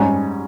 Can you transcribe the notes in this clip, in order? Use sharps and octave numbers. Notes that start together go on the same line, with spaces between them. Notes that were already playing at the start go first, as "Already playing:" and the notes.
Already playing: G#2 G3 C#4